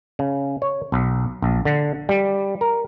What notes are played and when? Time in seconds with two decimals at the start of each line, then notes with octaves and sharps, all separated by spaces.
0.19 C#3
0.62 C#5
0.92 B1
1.42 A#1
1.65 D3
2.09 G3
2.61 A#4